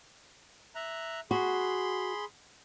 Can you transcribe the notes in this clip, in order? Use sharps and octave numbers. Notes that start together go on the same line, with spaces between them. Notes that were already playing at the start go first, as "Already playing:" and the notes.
E5 A#5 F#6
F#4 G#4 B5 C6